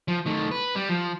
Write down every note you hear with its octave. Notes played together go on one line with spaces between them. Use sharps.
F3
D#3 A3
B4
G3
F3